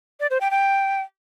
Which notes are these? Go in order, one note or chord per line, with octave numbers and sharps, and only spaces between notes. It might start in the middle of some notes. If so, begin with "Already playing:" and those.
D5
C5
G5
G5